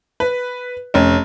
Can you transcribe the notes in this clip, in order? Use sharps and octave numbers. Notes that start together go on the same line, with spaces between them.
B4
F1 C#4